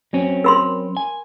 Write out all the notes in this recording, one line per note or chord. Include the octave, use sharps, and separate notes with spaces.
F#3 C4 C#4
A#4 B5 C6
G#5